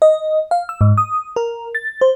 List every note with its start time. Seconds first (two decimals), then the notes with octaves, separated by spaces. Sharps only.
0.02 D#5
0.51 F5
0.69 E6
0.81 G#2
0.98 D#6
1.36 A#4
1.75 A6
2.01 C5